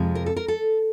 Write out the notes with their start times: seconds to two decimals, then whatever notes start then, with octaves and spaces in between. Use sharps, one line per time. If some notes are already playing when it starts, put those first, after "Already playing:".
Already playing: F2 C3 F3 G#3
0.15 A#4
0.26 A4
0.37 A#4
0.48 A4